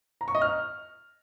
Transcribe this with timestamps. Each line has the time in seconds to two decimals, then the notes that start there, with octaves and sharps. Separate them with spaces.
0.21 A#5
0.28 C#6
0.35 D#5
0.42 F6